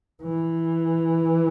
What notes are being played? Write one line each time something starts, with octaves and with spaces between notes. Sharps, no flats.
E3